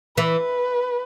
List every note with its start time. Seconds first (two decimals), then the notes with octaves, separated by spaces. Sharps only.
0.17 E3 B4